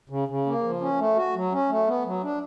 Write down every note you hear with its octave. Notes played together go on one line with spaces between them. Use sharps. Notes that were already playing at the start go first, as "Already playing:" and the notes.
C#3
C#3
A#3
F3
C#4
A3
F#4
F#3
C#4
A3
B3
F#3
D4